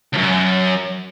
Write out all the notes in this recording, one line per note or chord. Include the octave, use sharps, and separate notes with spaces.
C#2 F#2